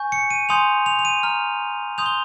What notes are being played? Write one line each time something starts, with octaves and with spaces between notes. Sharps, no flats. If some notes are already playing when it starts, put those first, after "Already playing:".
Already playing: G#5 C#6 G6
C#7
D#7
G#5 C6 D#6 G6 F7
F7
F7
D#7
A#5 F6
C6 D#6 G6 F7
G7